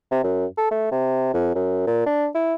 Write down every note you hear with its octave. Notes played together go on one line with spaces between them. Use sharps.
C3
F#2
A4
A3
C3
F2
F#2
A#2
D4
E4